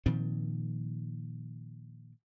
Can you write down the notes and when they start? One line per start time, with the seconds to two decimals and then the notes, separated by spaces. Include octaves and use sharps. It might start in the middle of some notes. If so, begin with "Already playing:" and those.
0.06 A#2 D#3 F3 C4